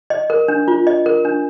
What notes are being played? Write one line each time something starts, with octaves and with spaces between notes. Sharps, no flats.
D#5
A#4
D4
F4
D#5
A#4
D4